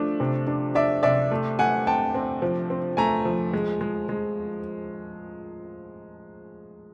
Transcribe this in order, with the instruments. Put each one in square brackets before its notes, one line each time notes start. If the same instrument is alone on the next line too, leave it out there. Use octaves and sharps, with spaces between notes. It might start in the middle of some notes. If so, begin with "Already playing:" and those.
Already playing: [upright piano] F3 A3 D4
C3
D4
[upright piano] D4 [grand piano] D5 E5
[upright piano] C3 [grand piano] D5 E5
[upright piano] A3
[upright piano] A3 [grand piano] F#5 G#5
[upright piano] C4 [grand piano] G5 A5
[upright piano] C4
F3
C4
[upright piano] A3 [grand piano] G#5 A#5
[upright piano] F3
G#3
G#3
G#3